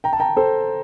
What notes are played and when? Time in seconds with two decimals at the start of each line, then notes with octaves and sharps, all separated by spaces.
0.04 G5 A#5
0.13 A5
0.20 G5 A#5
0.37 A4 C5